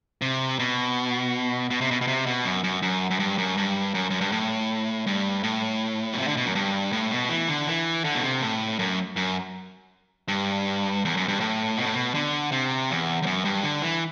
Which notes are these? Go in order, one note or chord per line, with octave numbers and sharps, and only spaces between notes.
C3
B2
B2
C3
B2
B2
C3
B2
F#2
F#2
F#2
F#2
G2
F#2
G2
F#2
F#2
G2
A2
G2
A2
B2
C3
D3
B2
F#2
G2
A2
B2
E3
D3
E3
D3
B2
C3
A2
F#2
F#2
G2
E2
F#2
G2
A2
B2
A2
B2
D3
C3
E2
E2
F#2
G2
D3
E3